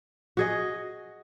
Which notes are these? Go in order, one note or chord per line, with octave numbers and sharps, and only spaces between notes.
F#4 G#4 D#5